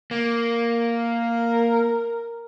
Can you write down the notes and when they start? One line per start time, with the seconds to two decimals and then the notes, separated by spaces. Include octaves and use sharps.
0.11 A#3
0.78 A#4